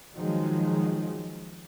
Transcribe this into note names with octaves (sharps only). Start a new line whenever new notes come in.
D#3 F3 F#3 G#3